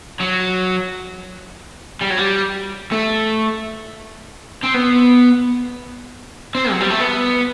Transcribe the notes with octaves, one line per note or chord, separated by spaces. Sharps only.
F#3
G3
F#3
G3
A3
C4
B3
C4
F#3
G3
A3
B3